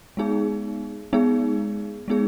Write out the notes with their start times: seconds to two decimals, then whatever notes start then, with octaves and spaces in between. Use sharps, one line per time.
0.17 G#3 B3 D#4 G#4
1.13 G#3 B3 D#4 G#4
2.08 G#3 B3 D#4 G#4